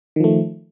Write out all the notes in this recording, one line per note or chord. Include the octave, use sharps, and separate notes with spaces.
D#3 F3 A3